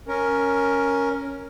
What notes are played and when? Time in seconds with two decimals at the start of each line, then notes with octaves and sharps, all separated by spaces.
0.08 C#4 A#4